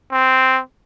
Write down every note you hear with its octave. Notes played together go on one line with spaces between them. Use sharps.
C4